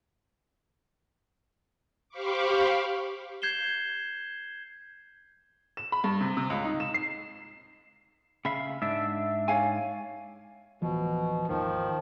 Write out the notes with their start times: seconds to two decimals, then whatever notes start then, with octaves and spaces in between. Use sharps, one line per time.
2.09 G4 C5 F5 B5 C#6 D6
3.42 G6 G#6 C7 E7 G7
5.77 E7
5.92 B5
6.04 G2
6.21 C3
6.37 C3
6.50 C#2
6.65 D#4
6.80 E7
6.94 C7
8.45 C#3 E5 F5 B5
8.82 G#2 D4 E5
9.48 C#5 F5 G#5
10.82 D1 B2 E3 F3
11.48 G#1 D#2 D#3 F3